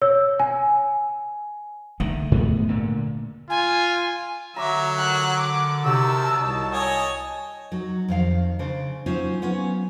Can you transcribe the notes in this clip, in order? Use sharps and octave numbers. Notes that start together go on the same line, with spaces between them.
C#5 E6
G#5
D3 D#3 A3
G#2 B3
A#2 D3
F4 G#5
D3 F#3 E5 A#5 D6
A#4 G5 F#6
D6
C3 D#3 F#3 A5 E6
C2 D#5
C#5 D#5 G5 G#5
F#3 D#4
F2 D#3 F5
C#3 D4 C5
F#3 C#4 D#4 F4 C5
F#3 B3 C#4 F4